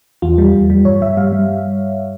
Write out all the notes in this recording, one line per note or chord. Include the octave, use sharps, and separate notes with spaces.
E2 F4
G3
E2
G3
G2 C#5
G2 E5
G3 F5
G3